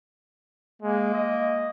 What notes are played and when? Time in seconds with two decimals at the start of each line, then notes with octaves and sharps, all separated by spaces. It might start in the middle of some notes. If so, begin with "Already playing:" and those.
0.82 G#3 A#3
1.14 D#5